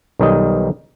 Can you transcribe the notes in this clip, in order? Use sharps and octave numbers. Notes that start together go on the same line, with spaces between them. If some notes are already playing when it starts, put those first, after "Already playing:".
B1 D#3 G3 D#5